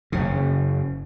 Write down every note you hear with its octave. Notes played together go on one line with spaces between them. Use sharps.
F#1 C#3